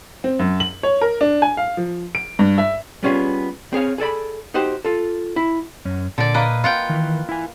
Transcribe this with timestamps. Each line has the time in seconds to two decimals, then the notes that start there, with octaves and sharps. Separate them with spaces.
0.24 C4
0.39 F#2
0.60 F#7
0.83 C#5
1.01 A#4
1.21 D4
1.42 G#5
1.57 F5
1.77 F3
2.15 D7
2.39 G2
2.58 E5
3.03 G3 B3 C#4 D4 F4 G#4
3.73 C4 G#4 C#5 F5
3.98 G#4 A4 D5 B5
4.54 D#4 F#4 G4 C5
4.85 F4 A4
5.36 E4
5.85 F#2 C#4
6.18 A#2 D3 D5
6.34 A#3 B4 D#5
6.64 F4 F#5 G5
6.89 D#3 E3
7.29 E4 G#5